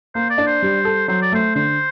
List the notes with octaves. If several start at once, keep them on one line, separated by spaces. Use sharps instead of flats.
A#3 C5
D5
D4
C5
G3
A4
F#3 C5
D5
A3 C5
D3 C5